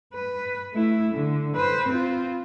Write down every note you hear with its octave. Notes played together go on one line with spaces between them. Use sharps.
B4
A3 E4
D3
B4 C5
C4 F4